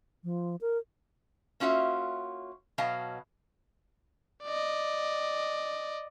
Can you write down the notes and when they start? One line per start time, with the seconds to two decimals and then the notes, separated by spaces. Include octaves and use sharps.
0.24 F3
0.61 A#4
1.60 A#3 C#4 F4 F#4 E5
2.78 B2 F#3 D#5 F5 A5
4.43 D5 D#5